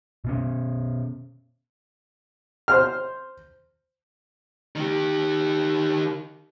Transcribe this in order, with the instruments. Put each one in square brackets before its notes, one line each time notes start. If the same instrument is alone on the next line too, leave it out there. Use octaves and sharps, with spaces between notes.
[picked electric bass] B2 B3 C#4
[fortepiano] C5 F6
[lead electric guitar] D#3 G4